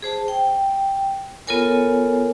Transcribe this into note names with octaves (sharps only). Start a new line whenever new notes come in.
G#4 C5 A5
G5
B3 F4 A4 A#4 C#5 G#5